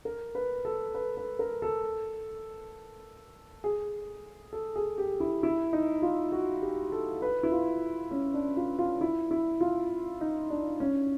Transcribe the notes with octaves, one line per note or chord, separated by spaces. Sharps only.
A#4
B4
A4
B4
B4
A#4
A4
G#4
A4
G#4
G4
E4
E4
D#4
F4
F#4
G4
A4
B4
E4
F4
C#4
D4
F4
F4
E4
E4
F4
D#4
D4
C#4